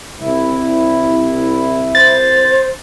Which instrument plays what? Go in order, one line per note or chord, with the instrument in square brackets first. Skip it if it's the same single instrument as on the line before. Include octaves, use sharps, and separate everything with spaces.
[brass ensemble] C2 [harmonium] E4
[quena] C5 [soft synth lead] A6